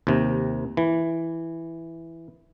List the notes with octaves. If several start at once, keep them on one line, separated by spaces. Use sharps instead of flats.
D#2 C3
E3